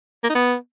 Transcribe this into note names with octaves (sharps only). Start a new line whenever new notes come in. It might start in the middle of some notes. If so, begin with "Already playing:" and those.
A#3
D#4
B3